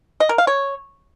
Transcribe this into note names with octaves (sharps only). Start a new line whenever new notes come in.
D#5
A#4
F5
C#5